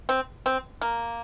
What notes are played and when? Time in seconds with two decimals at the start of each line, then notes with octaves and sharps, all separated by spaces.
0.09 C4
0.46 C4
0.81 A#3